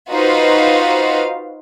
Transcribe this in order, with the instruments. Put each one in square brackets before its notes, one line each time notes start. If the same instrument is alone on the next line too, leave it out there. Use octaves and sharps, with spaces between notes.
[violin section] D#4 F4 F#4 B4 C5 F5